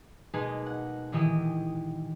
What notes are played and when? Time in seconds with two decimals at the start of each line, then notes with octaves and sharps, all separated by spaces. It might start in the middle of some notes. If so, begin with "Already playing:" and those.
0.34 B2 G#3 A#3 D#4 G#4 B4
0.66 F#5
1.12 A#2 D#3 E3 E4 G4 D#6